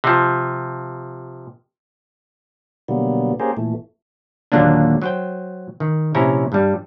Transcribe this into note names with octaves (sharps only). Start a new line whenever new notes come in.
C3 F3
B2 D3 F#3 G3 A#3 B3
A#3 C#4 G4 G#4 A#4 C5
A#2 E3 A3
D#2 A#2 D3 F#3 A#3 D4
F#3 C5 G5
D#3
A#1 C3 C#4 E4 C#5 A#5
G2 G3